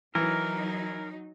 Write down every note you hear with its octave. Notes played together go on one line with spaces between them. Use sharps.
E3 F#3 D#4 A#4